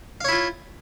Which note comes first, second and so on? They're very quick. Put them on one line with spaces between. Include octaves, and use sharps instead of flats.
F5 C#5 E4 F4